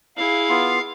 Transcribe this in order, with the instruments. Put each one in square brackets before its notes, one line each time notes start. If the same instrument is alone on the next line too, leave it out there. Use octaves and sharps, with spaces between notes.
[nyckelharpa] E4 G#4 [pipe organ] F5
[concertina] B3 F4